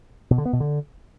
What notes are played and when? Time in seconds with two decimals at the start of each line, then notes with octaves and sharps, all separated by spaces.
0.31 B2
0.38 D3
0.45 B3
0.53 B2
0.60 D3